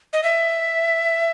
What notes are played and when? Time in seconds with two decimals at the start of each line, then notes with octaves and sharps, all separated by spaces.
0.13 D#5
0.23 E5